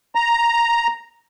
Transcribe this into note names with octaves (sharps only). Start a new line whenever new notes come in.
A#5